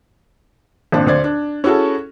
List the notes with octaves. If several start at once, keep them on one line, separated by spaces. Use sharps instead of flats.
G#1 A#2 C4 D4 A5
D2 C5 D5 G#6
D4
C#4 E4 F#4 G#4 A4